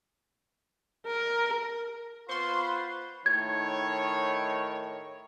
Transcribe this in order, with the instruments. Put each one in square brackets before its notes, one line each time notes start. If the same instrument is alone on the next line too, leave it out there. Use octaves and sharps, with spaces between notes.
[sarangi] A#4
[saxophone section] B3 C5 [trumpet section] F4 B4 [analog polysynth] C6 C#6
[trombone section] A2 D#3 [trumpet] C#5 [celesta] G#6